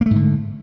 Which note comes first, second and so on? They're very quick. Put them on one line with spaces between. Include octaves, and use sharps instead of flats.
A#3 A3 G#2 D3